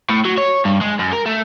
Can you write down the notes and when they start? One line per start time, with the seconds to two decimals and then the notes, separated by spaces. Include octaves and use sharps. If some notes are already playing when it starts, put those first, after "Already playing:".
0.09 A2
0.25 F#3
0.38 C#5
0.65 G2
0.81 G#3
0.99 F#2
1.13 A#4
1.26 A3